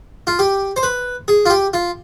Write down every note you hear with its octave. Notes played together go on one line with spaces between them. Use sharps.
F4
G4
C5
B4
G#4
F4
G4
F4